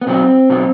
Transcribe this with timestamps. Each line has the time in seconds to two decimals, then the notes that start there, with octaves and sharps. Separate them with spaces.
0.01 B3
0.07 B2 F#3 C4
0.50 B2 F#3